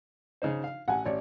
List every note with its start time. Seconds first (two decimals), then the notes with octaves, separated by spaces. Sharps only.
0.42 C#3 D#4 C5
0.64 F5
0.88 A1 F#5 G#5
1.05 A1 C#5 D5